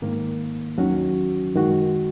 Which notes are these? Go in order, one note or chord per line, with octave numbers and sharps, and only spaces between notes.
G#2 D#3 A#3
D#2 D#3 F#3 C#4 F#4
F#2 D#3 G#3 F#4